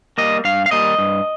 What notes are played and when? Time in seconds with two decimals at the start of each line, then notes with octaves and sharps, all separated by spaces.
0.18 G3 A#3 D#5
0.45 G2 F5
0.66 F5
0.71 G3 A#3 D#5
0.98 G2